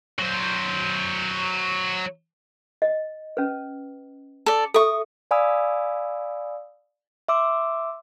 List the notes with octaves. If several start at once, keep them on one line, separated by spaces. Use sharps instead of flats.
F#3 C5
D#5
C#4 B4
A4 D5
A4 E5 C#6 D#6
D5 F5 G#5 B5 D#6 E6
E5 C6 D6 E6